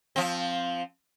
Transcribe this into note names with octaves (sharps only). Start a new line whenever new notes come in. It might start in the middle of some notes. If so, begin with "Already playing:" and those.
F3 C4